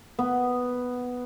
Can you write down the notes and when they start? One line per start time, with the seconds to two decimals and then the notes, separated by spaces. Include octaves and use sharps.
0.19 B3